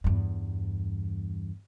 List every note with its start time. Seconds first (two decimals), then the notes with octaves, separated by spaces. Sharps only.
0.04 E2 G2